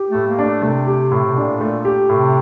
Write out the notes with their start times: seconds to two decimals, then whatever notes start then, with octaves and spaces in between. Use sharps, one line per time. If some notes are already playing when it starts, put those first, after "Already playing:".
Already playing: G4
0.09 A3
0.15 A2
0.27 A#3
0.39 D4
0.45 A3
0.63 C3 A3
0.87 G4
1.11 A2
1.25 C3
1.37 A#2 D4
1.60 A3
1.85 G4
2.09 A2 C3